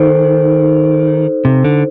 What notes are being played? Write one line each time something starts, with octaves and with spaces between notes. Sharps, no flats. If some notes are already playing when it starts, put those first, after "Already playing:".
Already playing: D#3 D#4 A4 C5
C3
D3